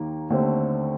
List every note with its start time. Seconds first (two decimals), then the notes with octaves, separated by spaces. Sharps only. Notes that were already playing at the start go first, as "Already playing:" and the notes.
Already playing: D#2 D#3 A#3
0.30 D#2 D3 A3 C4